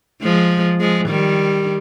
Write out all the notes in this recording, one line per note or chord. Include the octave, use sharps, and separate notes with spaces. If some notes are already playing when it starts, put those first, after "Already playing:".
F3 G#3
F3 G#3
D#3 G3